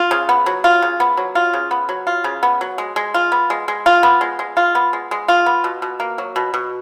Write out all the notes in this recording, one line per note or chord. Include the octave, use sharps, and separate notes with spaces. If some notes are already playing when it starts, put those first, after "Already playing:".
Already playing: F4
C#3
B3
F#3
F4
C#3
B3
F#3
F4
C#3
B3
F#3
F4
C#3
B3
F#3
G#3
G#3
F4
B3
G#3
G#3
F4
B3
G#3
G#3
F4
B3
G#3
G#3
F4
B3
B2
B2
A#3
F#3
B2
B2